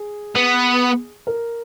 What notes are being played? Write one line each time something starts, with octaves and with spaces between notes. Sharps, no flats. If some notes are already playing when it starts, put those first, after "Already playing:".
Already playing: G#4
B3
A#4